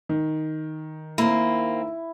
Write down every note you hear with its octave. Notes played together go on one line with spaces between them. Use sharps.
D#3
A#3 C4 E4